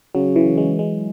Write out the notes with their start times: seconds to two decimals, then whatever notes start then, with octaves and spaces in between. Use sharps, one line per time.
0.15 C#3 F#3
0.36 E3
0.57 G#3
0.79 G#3